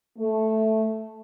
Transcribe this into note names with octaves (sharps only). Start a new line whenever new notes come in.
A3